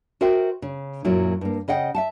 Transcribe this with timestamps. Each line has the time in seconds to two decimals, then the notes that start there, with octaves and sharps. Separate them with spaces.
0.21 F#4 A#4 C5 E5 G5
0.62 C#3
1.04 F#2 A#2 F#3 E4
1.41 G2 A#3
1.68 C#3 D#5 F#5 G5
1.95 E5 F#5 A5